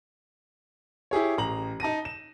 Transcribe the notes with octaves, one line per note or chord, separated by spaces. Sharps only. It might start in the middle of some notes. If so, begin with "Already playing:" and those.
E4 G4 G#4 C#5
A1 A#5 F#7
D#4 A5 A#6 D#7
E7